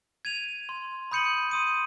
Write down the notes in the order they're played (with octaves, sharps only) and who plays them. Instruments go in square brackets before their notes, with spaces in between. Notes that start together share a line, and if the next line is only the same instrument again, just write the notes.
[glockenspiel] G#6 D#7 F7
C6
B5 D#6 G6 C#7 D#7 F#7
C6 D#6 D#7